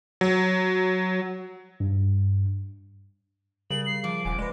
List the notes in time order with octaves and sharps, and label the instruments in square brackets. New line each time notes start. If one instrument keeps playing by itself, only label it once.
[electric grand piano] F#3
[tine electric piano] G2
[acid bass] C#3 [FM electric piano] G3 G#4 A#4 [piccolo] F#7
[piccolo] C7
[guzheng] F3 [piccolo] D6
[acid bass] D#1 [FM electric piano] F#5 G#5
[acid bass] G#3 [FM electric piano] B4 D5